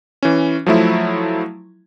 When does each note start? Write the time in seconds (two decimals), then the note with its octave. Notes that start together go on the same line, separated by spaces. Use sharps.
0.23 E3 C#4
0.66 F3 F#3 A3 E4